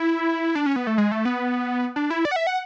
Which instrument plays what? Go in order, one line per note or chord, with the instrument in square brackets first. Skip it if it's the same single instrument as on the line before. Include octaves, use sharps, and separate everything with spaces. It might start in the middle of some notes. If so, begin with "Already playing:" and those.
Already playing: [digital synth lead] E4
D4
C#4
B3
A3
G#3
A3
B3
D4
E4
D5
F#5
E5
F#5